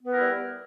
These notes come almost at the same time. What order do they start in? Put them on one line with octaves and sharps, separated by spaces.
B3 B4 A#4 E4 G3